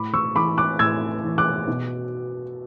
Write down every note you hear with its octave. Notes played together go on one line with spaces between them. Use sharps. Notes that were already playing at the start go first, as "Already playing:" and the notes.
Already playing: A2 B5 D6
C#6 E6
E3 B5 D6
D6 F#6
A2 E6 G#6
E3
D6 F#6
B2